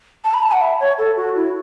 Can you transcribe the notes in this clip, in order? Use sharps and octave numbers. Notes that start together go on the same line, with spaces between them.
A5
B5
A5
F#5
E5
C#5
A4
F#4
E4